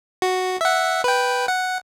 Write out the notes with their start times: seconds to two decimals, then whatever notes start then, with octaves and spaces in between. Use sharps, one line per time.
0.22 F#4
0.61 E5 F#5
1.04 B4 G5
1.48 F#5